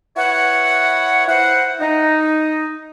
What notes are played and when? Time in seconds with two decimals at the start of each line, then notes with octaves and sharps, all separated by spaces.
0.16 E4 B4 C#5 F#5
1.28 E4 C5 F#5
1.80 D#4